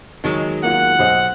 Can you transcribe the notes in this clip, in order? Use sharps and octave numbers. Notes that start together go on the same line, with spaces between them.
E2 D#3 F#3 G#3
A#3 F4 F#5
B1 C5 D#5